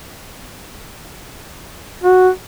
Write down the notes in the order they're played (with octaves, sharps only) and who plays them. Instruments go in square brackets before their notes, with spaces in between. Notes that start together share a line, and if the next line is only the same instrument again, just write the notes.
[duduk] F#4